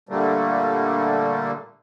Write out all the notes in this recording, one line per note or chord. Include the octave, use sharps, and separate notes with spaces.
A#2 D3 G3 A3 A#3